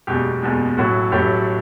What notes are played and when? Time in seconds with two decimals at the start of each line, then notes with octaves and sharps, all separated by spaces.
0.07 F#1 E2 B2 G#3 G4
0.42 F#1 E2 B2 G#3
0.78 A1 A2 F#3 A3 F#4
1.12 A1 A2 F#3 A3 G4